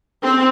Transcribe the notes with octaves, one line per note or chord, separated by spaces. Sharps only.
C4